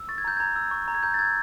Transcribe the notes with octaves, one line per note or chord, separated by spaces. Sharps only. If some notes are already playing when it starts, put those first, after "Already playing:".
Already playing: E6
C#6 A6
G#6
A#5 G6
A#5 G#6
E6
C#6
A#5
G#6
A#5 G6
A6
E6 G#6